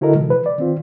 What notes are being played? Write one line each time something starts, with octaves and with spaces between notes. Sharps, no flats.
D3 E4 F#4 A4 A#4 D#5
C3 E3 G#3
B4
D5
D#3 C4 F4